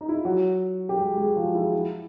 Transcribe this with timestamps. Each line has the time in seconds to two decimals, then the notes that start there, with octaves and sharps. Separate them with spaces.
0.01 D#4
0.09 E4
0.16 F4
0.25 F#3 F#4
0.89 G4
0.99 G#3 G#4
1.18 G#3 G#4
1.36 F3 F4
1.55 E4
1.73 E4